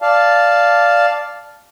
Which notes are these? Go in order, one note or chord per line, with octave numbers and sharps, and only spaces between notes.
D5 F5 A5